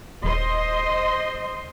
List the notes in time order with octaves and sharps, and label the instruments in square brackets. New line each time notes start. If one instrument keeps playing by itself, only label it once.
[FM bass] D#1 [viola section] C5 D#5 C6